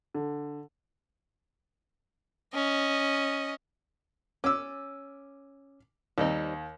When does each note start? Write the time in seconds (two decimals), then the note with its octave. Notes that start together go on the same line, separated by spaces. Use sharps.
0.14 D3
2.54 C#4 D#5
4.44 C#4 D6 E6
6.18 D#2 G3 C4 D#4